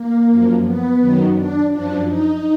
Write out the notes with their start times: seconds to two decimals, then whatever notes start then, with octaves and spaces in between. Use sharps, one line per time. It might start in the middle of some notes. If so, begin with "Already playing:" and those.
Already playing: A#3
0.30 F#2 F3
0.65 B3
1.00 F#2 D#3 F#3
1.36 D4
1.71 F#2 F3 D4
2.07 D#4